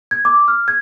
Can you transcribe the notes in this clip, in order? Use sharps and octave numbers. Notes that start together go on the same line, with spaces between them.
G#6
D6
F6
G#6